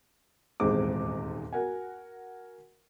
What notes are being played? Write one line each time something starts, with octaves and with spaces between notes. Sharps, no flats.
D#1 E2 G#2 G#3 C4 D6
F#4 A#4 F#5 G#5